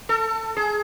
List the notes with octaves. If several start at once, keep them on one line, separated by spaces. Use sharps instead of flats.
A4
G#4